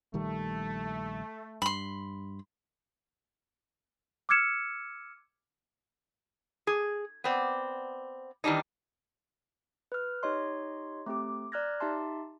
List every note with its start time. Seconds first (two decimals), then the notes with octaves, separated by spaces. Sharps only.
0.14 A#1 D#3 G3 A3
1.62 G2 B5 C6
4.29 D6 E6 F6 G#6 C#7 E7
6.67 G#4
7.24 B3 C4 D5
8.44 D#3 E3 G3 D4 D#4
9.92 B4 F6
10.23 D#4 G4 C#5 D#5 C6
11.06 A3 C4 G4 D6
11.52 D5 A#5 F6 F#6 G#6 A#6
11.80 D#4 G4 E5 A5 C6